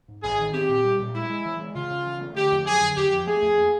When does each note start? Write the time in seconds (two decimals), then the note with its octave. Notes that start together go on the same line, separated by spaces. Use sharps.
0.08 G#2
0.23 A1 G#4
0.38 D#3
0.53 C4 G4
0.69 A#2
0.84 G3
0.99 A#2
1.14 G#3 E4
1.30 G#3
1.45 E3
1.60 G#3
1.75 C#3 F4
1.90 C#3
2.06 E3
2.21 A3
2.36 D3 G4
2.52 F2
2.66 F#3 G#4
2.81 D3
2.97 F2 G4
3.12 F3
3.27 A3 G#4
3.42 F2
3.58 A#3